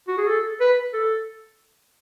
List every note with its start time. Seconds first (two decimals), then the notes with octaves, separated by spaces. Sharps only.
0.08 F#4
0.18 G#4
0.28 A4
0.61 B4
0.93 A4